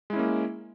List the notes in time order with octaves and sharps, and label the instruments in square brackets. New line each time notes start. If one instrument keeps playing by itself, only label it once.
[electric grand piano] G#3
E4
C#4
A#3